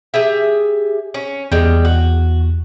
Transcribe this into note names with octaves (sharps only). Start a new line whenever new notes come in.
G4 G#4 E5
C#4
E2 G3 G#3
F#4